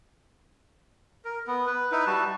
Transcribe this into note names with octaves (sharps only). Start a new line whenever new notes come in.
A#4
B3
B4
D#4 E4 B4
G3 F#4 A5